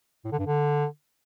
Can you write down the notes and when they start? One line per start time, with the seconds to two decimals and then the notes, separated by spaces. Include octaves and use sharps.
0.25 A2
0.32 D3
0.39 G2
0.46 D3